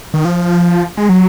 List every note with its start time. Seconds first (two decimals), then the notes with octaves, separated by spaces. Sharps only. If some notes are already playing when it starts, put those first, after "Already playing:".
0.14 D#3
0.25 F3
0.97 G#3
1.09 F#3